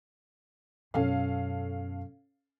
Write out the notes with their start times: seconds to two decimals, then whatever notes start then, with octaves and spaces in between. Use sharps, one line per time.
0.94 F#2 B2 C#4 A4 F5